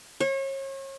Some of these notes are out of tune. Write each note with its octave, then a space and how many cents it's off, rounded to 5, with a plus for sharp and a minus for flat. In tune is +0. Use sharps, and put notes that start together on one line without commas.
C#5 -35